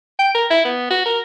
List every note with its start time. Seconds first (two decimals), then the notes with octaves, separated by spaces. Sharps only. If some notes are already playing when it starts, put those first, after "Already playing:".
0.19 G5
0.35 A#4
0.50 E4
0.65 B3
0.91 F#4
1.06 A#4